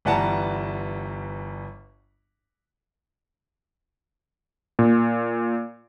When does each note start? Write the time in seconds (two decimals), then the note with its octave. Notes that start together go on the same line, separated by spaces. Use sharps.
0.05 G1 E3 G3 F#5 A5 A#5
4.79 A#2